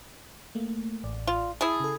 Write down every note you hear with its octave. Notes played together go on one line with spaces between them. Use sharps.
A3 A#3
A1 D5
F4
E4 G#4 A5
C#3 A4